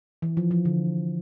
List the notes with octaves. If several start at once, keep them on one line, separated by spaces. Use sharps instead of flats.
E3
F3
F3
D3